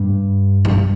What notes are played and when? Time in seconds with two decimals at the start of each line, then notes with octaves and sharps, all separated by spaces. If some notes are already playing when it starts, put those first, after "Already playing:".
Already playing: G2
0.65 G2